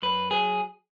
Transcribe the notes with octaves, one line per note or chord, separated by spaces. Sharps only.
F#2 B4
F#3 G#4